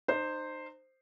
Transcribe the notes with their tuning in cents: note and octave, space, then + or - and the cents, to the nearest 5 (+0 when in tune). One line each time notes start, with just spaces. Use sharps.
D#4 -30 C5 +0